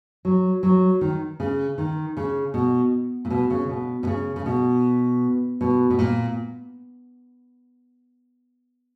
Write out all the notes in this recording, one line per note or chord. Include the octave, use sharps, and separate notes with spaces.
F#3
F#3
D#3
C#3
D#3
C#3
B2
A#2
B2
C#3
B2
B2
C#3
C#3
B2
B2
B2
A#2